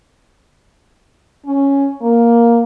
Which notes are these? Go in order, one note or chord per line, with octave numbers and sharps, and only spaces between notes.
C#4
A#3